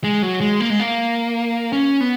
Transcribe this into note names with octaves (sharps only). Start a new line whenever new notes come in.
G#3
F#3
G#3
A#3
G#3
A#3
C#4
B3